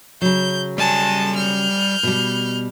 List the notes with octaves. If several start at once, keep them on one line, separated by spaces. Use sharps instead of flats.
C#3 F#3 G6
G3 G#5 A5
F6 G6
B2 G3